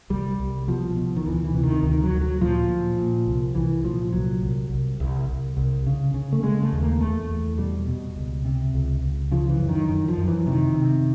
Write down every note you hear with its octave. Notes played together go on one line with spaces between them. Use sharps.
C2 G3
C2
B2 F3
B2
D#3
D2 E3
E3
C3
D#3
D2 D#3
F#3
D2
F#3
A#2 F3
A#2
A#2
C2
C2 E3
A#2 F3
C2 F#3
C2
C2
C2
C2
C2
C#3
C#3
A3
C#3 G#3
A3
D#2
A#3
E2 A3
E2
B2 G3
B2
C#2
C3
C#2
C#2
C#3 F3
E3
F#2
D#3
F#2 D#3
F3
F#2
E3
C3 D#3
C3